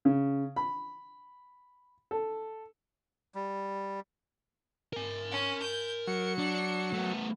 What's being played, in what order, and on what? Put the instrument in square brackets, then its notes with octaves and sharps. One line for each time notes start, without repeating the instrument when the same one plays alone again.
[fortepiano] C#3
B5
A4
[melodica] G3
[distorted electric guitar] A#4 G#5
[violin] C#4
G6
[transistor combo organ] F#3 [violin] C#7
[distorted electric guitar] D4
A3 B3